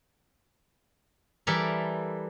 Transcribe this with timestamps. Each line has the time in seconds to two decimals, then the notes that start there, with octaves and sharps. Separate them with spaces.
1.47 E3 G3 A4 A#4